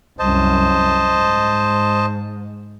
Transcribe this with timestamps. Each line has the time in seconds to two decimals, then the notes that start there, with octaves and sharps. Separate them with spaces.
0.19 C2 F#2 C5 D#5 A5
1.13 G#2